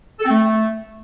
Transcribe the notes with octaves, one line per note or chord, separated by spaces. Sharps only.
A4
C4
A3